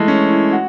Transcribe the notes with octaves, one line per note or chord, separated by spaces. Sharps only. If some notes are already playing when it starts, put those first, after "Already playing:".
Already playing: E3 G#3 A3
C#4
E4
F#4